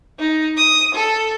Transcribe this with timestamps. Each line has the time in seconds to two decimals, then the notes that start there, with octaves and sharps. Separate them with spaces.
0.19 D#4
0.57 D#6
0.95 A4